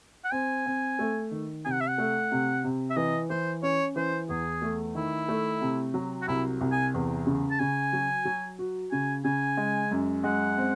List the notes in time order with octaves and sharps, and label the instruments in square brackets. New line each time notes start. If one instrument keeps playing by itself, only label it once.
[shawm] F#5
[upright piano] C4 [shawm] G#5
[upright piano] C4
A3
D#3
[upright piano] C3 [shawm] G#5
[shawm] F#5
E5
F#5
[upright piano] A3
C3
C3
[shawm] E5
[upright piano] E3 [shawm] D#5
[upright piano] E3 [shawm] C5
[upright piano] C#4 [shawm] C#5
[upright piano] E3 [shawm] C5
[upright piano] E2 [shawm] G#4
[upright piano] A3
[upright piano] D#3 [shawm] E4
[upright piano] A3
C3
F#3
[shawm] F#4
[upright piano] C2 [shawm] E4
[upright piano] C2
[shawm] G#5
[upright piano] E2
C#3
[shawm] A5
[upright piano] C#3 [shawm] G#5
[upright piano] F#3
F#3
F#4
[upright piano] C#3 [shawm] G#5
[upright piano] C#3 [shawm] G#5
[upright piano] G#3
F#2
[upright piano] G#3 [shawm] F#5
[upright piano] C4